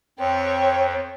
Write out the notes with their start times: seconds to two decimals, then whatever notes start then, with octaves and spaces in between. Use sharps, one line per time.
0.19 F2 C4 C#5 G5